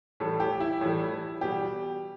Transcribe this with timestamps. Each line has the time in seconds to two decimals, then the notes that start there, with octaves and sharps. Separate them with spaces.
0.20 A2 E3 G3 A4
0.40 G4
0.60 E4
0.81 A2 E3 G3
1.41 B2 G3 G4